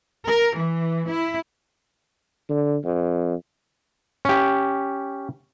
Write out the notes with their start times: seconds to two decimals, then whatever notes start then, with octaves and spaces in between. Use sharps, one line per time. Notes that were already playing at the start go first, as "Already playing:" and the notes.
0.26 A#4
0.57 E3
1.07 E4
2.49 D3
2.84 F2
4.25 C#4 G4